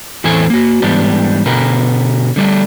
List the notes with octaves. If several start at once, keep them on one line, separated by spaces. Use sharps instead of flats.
E2 A2 E3 A3 C4 G#5
A#3 F#4
G#2 E3 G3 B3 D4
B2 D3 A#4 B4
D3 G3 A3 D4